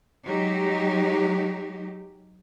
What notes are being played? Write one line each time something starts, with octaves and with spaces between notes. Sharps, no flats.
F#3 G#3 D#4 G4